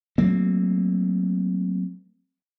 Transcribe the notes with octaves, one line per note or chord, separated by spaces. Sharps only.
F#3 A3 A#3 C4